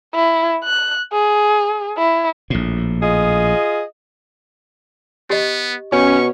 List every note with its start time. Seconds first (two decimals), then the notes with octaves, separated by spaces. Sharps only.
0.15 E4
0.64 F#6
1.13 G#4
1.98 E4
2.50 A#1 A2
3.03 F4 G#4 D#5
5.30 B3 G4 D#5
5.92 B2 C#4 C#5 C#6